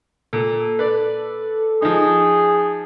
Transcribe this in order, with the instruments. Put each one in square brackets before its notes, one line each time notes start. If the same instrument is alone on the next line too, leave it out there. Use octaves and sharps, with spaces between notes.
[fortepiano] A#2 [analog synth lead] A4
[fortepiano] B4 D5
[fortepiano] F3 D#4 [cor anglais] G#4